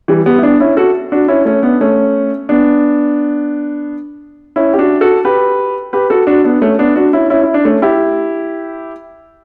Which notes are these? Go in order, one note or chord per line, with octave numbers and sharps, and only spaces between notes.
E3 G3
G3 B3
E4
B3 D4
C#4 E4
F#4 A4
D4 F#4
C#4 E4
A3 C#4
B3 D4
A3 C#4
B3 D4
C#4 E4
G4
D4 F#4
F#4 A4
G4 B4
G4 B4
F#4 A4
D4 F#4
B3 D4
A3 C#4
B3 D4
D4 F#4
C#4 E4
C#4 E4
E4
D4
A3 C#4
E4 G4